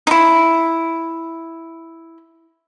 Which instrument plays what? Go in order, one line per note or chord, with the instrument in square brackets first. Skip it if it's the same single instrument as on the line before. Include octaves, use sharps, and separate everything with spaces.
[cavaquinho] D#4 E4